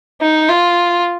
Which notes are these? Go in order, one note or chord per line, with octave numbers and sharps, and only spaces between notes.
D#4
F4